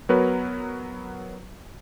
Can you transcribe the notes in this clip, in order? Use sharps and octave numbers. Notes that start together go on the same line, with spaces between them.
F#3 B3 F#4 A#4 B4 C#5